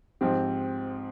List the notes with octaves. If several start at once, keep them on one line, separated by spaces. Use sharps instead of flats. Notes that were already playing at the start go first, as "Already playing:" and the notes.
G#2 F3 C4 G4